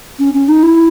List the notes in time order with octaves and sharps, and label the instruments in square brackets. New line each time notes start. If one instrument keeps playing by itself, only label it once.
[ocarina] C#4
C#4
D#4
E4